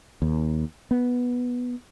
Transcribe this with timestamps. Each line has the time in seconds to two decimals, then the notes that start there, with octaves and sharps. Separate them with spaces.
0.22 D#2
0.91 B3